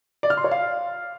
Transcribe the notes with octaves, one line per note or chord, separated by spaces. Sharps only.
D5
F6
C6
C#5
F5